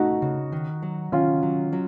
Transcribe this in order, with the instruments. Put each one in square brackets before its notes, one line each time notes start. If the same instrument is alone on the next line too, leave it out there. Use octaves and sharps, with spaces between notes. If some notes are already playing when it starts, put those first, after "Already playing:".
Already playing: [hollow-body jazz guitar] A3 [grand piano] D#4 F#4
[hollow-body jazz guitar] C#3
D#3
F#3
[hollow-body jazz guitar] D#3 [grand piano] C#4 F4
[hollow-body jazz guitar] F#3
F#3